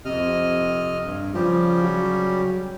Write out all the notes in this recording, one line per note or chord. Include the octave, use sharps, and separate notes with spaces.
F2 C3 D#5 F6
G2
C#3 F3 G3 G4
F#3